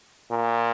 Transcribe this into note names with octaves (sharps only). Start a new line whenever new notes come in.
A#2